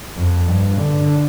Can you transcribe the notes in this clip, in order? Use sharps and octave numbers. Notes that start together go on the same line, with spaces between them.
F2
G2
D3